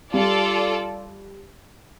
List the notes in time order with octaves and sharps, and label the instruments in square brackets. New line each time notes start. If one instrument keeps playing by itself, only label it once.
[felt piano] G3 [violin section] F4 A4 D5